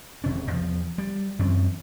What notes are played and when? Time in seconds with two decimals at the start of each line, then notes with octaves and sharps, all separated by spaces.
0.24 E1 C3 C#4
0.51 E2 F3
0.98 G3
1.39 F#2 E3 C4 C#4